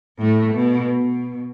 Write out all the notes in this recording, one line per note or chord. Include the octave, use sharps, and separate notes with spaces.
A2 A3
B2
B2